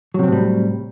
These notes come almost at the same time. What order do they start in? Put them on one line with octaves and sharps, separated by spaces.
F#3 C3 C4 A2 G3